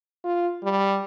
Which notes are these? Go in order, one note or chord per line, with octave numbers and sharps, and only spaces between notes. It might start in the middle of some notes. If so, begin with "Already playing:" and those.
F4
G3